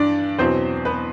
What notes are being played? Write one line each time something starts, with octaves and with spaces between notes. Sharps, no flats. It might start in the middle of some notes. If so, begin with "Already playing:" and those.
Already playing: G2 E3 D4 D5
E2 B2 F#3 C4 C5
B3 B4